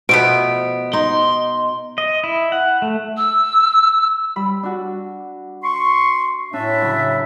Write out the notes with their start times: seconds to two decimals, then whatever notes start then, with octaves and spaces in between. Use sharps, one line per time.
0.09 B2 F3 A3 B3 D7
0.93 D#4 C6
1.98 D#5
2.24 E4
2.52 F#5
2.82 A3
3.17 E6
4.36 G3 B5 E6
4.63 D4 F#4
5.63 C6 C#6
6.53 A2 C#4 D4 E5
6.81 F#2 C#3